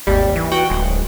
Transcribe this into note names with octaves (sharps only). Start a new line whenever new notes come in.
G#1 D#2 G3
E3
F#4 F#5 G5
D1 G#3